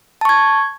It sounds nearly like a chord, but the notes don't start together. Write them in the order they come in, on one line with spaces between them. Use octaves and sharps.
A5 C#6 G#6